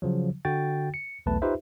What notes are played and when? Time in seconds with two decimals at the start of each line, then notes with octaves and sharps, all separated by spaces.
0.02 C#3 F3 F#3
0.45 D3 F#4 G5 A6
0.94 C#7
1.26 B1 E2 A3 B4 A5
1.42 D#4 F4 G4 B4 C5 E5